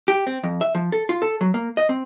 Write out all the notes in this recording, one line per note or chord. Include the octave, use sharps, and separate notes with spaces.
G4
C4
F2
E5
F3
A4
F4
A4
F#3
A#3
D#5
C4